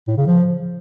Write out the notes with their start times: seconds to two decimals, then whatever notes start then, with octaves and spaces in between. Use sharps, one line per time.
0.08 A2
0.17 C#3
0.27 F3